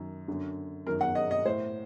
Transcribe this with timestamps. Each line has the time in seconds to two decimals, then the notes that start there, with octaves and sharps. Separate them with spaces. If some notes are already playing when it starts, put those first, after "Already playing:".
Already playing: F#2 D#3
0.28 F#2 D3
0.86 F#2 D#3 A#4
1.01 F#5
1.15 D#5
1.31 D#5
1.45 A2 C5